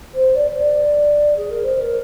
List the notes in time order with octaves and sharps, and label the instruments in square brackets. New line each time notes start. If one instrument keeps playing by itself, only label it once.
[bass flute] C5
D5
D5
G#4
A#4
C5
A#4